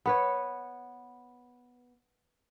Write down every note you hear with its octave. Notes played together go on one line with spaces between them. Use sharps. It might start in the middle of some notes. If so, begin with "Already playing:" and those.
B3 B4 C#5